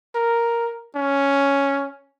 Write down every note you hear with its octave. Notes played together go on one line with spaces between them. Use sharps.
A#4
C#4